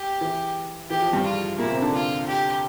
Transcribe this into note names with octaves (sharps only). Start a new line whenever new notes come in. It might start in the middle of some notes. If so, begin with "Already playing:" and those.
Already playing: G4
E3
E3 G4
F3
G2 G3
F4
A#2 A#3 E4
C3 C4
D3 D4
F4
G4